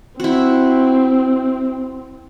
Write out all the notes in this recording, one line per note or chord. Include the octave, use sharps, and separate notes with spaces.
C4 E4 F#4